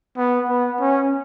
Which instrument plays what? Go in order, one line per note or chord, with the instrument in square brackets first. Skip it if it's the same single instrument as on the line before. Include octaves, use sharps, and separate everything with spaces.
[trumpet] B3
B3
C#4